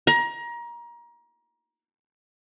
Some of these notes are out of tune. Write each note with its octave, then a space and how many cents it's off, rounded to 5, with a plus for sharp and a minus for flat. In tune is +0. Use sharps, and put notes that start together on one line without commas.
A#5 +25